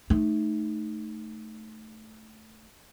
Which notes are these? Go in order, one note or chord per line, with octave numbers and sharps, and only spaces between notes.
A3 D#4